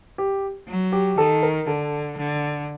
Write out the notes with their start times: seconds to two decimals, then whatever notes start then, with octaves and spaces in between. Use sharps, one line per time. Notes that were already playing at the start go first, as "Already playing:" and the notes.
0.18 G4
0.68 F#3
0.92 G4
1.18 D#3 A4
1.43 A#4
1.67 D3 A4
2.17 D3